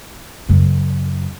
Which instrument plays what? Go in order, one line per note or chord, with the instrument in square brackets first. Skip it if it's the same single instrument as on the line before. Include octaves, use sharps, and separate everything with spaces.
[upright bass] F#2 C#3